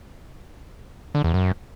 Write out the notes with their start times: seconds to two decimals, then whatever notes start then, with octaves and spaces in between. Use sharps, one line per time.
1.15 D3
1.24 E2
1.34 F#2